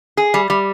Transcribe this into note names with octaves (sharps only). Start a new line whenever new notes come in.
G#4
G3
G3